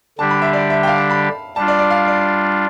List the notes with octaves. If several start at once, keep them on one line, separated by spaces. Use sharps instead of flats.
D3 G3 D4 G4 A5
B5
E5
D5
E5
G5
F5
A5
B5
G3 D4 F4 A5
D5
D5
F5
D5